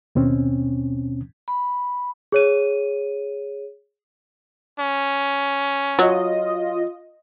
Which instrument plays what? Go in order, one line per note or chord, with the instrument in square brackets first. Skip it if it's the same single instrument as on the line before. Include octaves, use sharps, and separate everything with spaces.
[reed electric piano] D#2 B2 C4 C#4
[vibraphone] B5
[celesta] G#4 C#5 D#7
[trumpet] C#4
[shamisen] F#3 [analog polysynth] F4 D#5